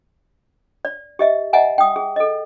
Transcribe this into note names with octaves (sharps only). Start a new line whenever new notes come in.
D5
G4 D#5 E5
D#5 E5 F#5 G#5 A#5
G5 D#6
G#4
A4 D#5